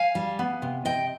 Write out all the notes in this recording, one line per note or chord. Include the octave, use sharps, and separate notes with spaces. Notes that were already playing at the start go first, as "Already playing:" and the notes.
Already playing: F5 G#5
G3
B3
C3
C3 D#5 G5